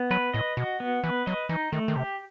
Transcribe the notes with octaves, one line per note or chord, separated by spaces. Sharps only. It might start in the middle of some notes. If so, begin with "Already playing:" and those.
Already playing: B3
F#3 B4
A2 D#5
B2 F#4
B3
E3 B4
F#3 D#5
E3 D#4
D#3 A3
D#3
C3 G4